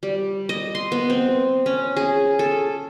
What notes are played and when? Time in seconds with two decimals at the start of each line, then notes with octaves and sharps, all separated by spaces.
0.03 G3
0.49 D#5
0.75 C6
0.92 B3
1.10 C4
1.66 C#4
1.97 G#4
2.39 A4